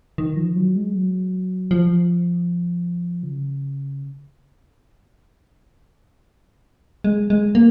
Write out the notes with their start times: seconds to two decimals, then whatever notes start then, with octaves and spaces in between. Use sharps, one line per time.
0.18 D#3
0.37 F3
0.55 F#3
0.75 G#3
0.94 F#3
1.71 F3
3.23 C#3
7.04 G#3
7.30 G#3
7.55 A#3